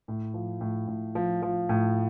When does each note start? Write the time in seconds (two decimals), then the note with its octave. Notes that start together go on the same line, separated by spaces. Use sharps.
0.08 A2
0.34 F3
0.61 A2
0.87 A2
1.15 F3
1.42 F3
1.69 A2